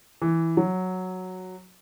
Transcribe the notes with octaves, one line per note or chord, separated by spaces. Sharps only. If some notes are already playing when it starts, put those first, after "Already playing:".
E3
F#3